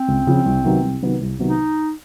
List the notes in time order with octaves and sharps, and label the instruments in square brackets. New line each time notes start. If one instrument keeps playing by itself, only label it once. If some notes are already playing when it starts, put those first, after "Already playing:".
Already playing: [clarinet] C4
[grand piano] C#2
C#3 F3
C2
C3 D#3 F#3 B3
C2
C3 D#3 F#3 B3
C2
C3 D#3 F#3 B3
[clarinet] D#4